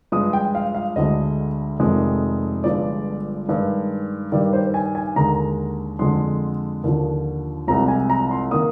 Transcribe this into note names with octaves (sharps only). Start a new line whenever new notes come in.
G2 F3 G#3 D#6
G5
F5
F5
D2 D3 G#3 D#5
F1 F2 C3 D#3 G#3
G1 G2 F3 G#3 D5
G2 D#3 G#3
G2 D#3 G3 D5
C5
G#5
G#5
D#2 D3 G#3 A#5
F2 D3 G#3 C6
D#2 D3 F3
C2 C3 F3 G#3 A#5
G#5
A#5
C6
D#3 A#3 D#6